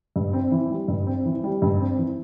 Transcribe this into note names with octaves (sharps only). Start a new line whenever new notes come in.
G2
C4
E3
G3
G2
C4
E3
G3
G2
C4
E3